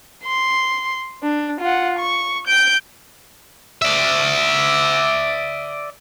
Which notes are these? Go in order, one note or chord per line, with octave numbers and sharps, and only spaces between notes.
C6
D4
F4 F#5
C#6
G6 D7
D5 E5